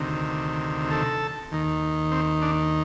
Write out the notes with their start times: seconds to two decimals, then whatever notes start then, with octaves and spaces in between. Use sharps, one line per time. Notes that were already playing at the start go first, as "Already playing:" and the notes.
Already playing: D2 C3 D#3
0.91 A4
1.52 D#2 D#3
2.12 C4
2.42 D4